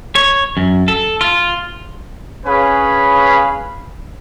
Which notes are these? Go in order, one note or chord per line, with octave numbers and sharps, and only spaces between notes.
C#5
F#2
A4
F4
C#4 G#4 B4 C#5 F5 B5